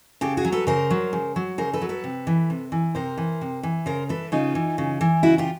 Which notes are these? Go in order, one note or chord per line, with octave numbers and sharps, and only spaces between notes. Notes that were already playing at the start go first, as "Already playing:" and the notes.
C#3 G4 A4
F#4 G#4
F#3
A4 B4
C#3 A#4 C5
F#3
C#3
F#3
C#3 A#4 C5
A4 B4
F#3
A4 B4
C3
E3
C3
E3
C3 A#4 C5
E3
C3
E3
C#3 A#4 C5
E3 A4 B4
C#3 D#4 F4
E3
C#3
E3
C#3 E4 F#4
F4 G4